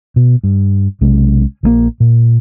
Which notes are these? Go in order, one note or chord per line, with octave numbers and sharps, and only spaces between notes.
B2
G2
B1 C3 G#3 C#4
A#1 F3 A#3
A#2